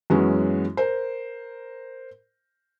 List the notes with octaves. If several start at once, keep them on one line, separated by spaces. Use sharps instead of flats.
F#2 E3 G#3 B3 C#4 F#4
A#4 C5